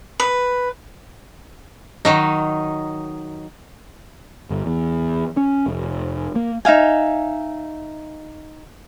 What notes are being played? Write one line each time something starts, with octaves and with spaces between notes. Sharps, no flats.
B4
D#3 F#3 D#4
G1
E2
C#4
F1
A#3
D#4 E5 F5 G#5